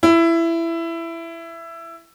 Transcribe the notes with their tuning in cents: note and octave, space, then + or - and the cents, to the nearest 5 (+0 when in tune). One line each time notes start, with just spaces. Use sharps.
E4 +15